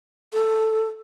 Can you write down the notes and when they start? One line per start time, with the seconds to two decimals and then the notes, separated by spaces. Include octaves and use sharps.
0.33 A4